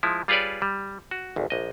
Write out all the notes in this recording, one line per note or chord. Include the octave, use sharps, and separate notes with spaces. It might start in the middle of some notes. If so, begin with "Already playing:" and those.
F3 G#3 E4
G3 F4 G#4 B4 C#5 D5
G3
F#4
G#1 D2
A#1 D#5